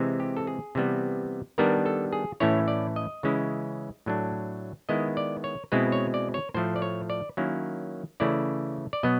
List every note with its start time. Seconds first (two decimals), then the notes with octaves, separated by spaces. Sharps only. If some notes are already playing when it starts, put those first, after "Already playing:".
Already playing: C3 E3 G#3 C4
0.20 G4
0.37 A4
0.47 G#4
0.75 C3 E3 G3 B3
1.58 D#3 G3 B3 D4 A#4
1.86 A4
2.13 G#4
2.40 A2 E3 A3 C#4 E4 C#5
2.68 D5
2.96 D#5
3.23 C#3 E3 G#3 C#4 E4
4.06 A2 F#3 A3 D4
4.89 D#3 G#3 B3 E4 D#5
5.17 D5
5.44 C#5
5.72 B2 G#3 C4 E4 B4
5.92 C#5
6.14 D5
6.34 C#5
6.54 A2 F3 A3 C5
6.76 D5
6.82 C#5
7.10 D5
7.37 D#3 F#3 A#3 C#4 E4
8.20 C#3 E3 A3 C#4 E4 D5
8.93 D5
9.03 B2 F#3 B3 D#5